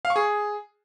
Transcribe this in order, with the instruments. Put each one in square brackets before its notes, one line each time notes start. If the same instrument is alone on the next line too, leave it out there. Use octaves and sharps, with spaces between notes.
[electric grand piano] F5
C#6
G#4